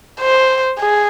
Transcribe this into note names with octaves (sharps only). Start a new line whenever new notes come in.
C5
G#4